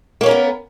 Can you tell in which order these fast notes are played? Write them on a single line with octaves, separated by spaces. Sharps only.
A#3 C#5 C#4 A#4 B3